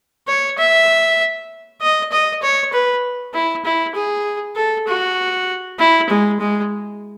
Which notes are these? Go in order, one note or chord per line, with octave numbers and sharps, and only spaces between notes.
C#5
E5
D#5
D#5
C#5
B4
E4
E4
G#4
A4
F#4
E4
G#3
G#3